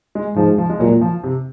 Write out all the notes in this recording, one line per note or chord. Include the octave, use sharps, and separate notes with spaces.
G#3
G#2 F3
F3
G#3
A#2 F#3
F3
C3